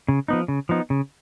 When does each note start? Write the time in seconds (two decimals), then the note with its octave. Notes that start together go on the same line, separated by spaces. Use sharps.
0.08 C#3
0.28 F3 B3 D#4
0.48 C#3
0.69 F3 B3 D#4
0.90 C#3